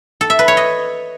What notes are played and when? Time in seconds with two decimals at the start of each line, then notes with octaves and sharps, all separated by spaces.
0.21 A4
0.30 E5
0.39 B4
0.48 C#5
0.57 D#5